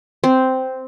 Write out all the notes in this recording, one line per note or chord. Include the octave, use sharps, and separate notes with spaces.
C4